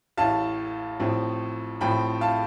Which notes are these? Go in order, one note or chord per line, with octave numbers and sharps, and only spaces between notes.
A1 A2 E3 F5 A5
A1 A2 F3 C4
A1 A2 F3 C4 G5 B5
F5 A5